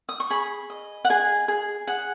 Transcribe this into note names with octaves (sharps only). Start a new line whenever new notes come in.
D#6
C#6
G#4 B5
D#5
F#5
G#4 G#5
G#4
G#4 F#5